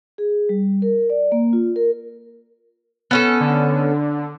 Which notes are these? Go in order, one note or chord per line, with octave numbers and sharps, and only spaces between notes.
G#4
G3
A#4
D5
A#3
F4
A#4
B3 C#4 A4
D3